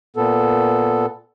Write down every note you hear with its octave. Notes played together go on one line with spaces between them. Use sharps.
A#2 B3 A4